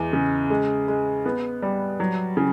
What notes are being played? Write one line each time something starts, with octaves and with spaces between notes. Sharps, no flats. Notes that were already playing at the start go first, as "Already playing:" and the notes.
Already playing: E2 G#3
C#3
G#3
G#3
B3
G3
F#3
C#3